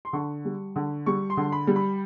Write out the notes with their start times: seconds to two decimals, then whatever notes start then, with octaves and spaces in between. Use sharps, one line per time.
0.05 C6
0.13 D3 C#6
0.45 G3
0.76 D3
1.06 G3 C#6
1.30 C6
1.37 D3
1.52 B5
1.67 G3
1.76 B5